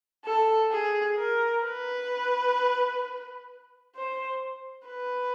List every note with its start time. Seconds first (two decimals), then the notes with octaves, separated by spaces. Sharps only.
0.24 A4
0.72 G#4
1.17 A#4
1.63 B4
3.95 C5
4.87 B4